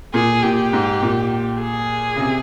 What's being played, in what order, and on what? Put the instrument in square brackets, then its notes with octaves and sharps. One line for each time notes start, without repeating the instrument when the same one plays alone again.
[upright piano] A#2 [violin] G#4
[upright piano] A#2 [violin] G4
[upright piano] G#2
A#2
[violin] G#4
[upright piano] C#3
C3